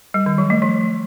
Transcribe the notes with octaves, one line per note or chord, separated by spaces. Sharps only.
G3
D#3
F#3
A3
F3